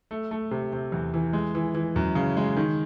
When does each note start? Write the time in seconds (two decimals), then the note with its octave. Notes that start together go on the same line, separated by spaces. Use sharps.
0.11 A3
0.31 A3
0.51 C3
0.73 C3
0.92 E2
1.14 E3
1.33 G#3
1.55 E3
1.75 E3
1.96 F#2
2.15 C#3
2.37 G#3
2.57 D#3